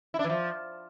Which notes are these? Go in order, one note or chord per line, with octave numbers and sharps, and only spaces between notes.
E4
D4
E3
F3